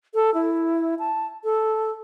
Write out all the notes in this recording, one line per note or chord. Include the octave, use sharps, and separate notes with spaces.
A4
E4
A5
A4